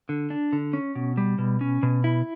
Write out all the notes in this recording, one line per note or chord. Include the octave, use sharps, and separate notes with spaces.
D3
D4
D3
C#4
B2
G3
B2
C#4
B2
E4